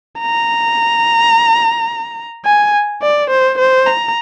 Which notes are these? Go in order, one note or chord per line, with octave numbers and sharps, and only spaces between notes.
A#5
G#5
D5
C5
C5
A#5